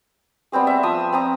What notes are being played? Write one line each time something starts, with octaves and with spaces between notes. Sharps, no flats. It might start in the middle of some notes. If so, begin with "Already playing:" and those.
G3 B3 C4 G#4
E5
F3 D#6 E6
C4 A#5 D#6